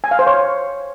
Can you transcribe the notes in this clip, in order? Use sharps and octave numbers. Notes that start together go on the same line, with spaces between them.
G#5
F5
C5
C#5